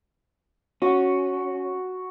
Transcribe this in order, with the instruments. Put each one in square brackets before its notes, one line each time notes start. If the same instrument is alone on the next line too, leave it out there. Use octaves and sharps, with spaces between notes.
[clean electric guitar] C#4 [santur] F#4